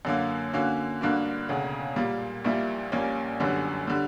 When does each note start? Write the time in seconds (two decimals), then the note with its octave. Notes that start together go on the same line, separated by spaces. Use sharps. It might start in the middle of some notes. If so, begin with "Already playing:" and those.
0.05 F#2 D3 A#3
0.53 D3 A#3 C#4 F#4
1.01 G2 D3 A#3 D4 F#4
1.49 E1 D2 C#3
1.96 A#2 G3 A#3
2.44 A#1 A#2 G3 A#3 E4
2.92 A#1 A#2 G3 A#3 C#4
3.40 G1 F#2 D3 G3 C#4
3.87 D3 G3